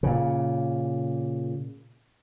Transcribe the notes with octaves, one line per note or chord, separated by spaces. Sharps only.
A#2 C#3